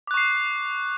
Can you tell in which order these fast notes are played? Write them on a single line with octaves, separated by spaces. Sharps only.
D6 F#6 C#6 C7